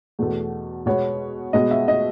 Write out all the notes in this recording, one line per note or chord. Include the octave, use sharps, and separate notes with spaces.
E2 B2 A3
B2 G#3 B3 C#5
B2 G#3 B3 D#5
E5
D#5